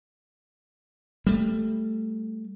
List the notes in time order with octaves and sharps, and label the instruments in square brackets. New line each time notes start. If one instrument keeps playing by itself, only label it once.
[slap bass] G3 A3